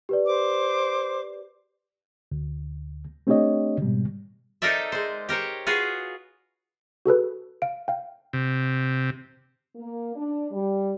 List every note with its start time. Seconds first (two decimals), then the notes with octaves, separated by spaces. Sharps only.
0.09 G4 B4 D5
0.27 C5 D6
2.32 D2
3.27 A3 C4 D4 G4 C#5 D#5
3.82 G#2 B2 G3
4.62 D#4 A4 A#4 C5 D5 E5
4.92 G#3 C5
5.29 G4 A#4 C5 C#5
5.67 F4 F#4 G#4 B4 F5
7.06 F#4 G#4 A4 B4
7.62 F5 D7
7.88 F5 G5
8.33 C3
9.76 A#3
10.16 D4
10.52 G3